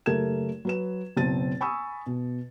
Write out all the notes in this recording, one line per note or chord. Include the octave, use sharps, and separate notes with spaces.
F#1 A3 G4 A#4 G#6 E7
F#3 B4 E7
F#1 B2 C4 A6 D#7
G#5 B5 C#6 D#6 E6
B2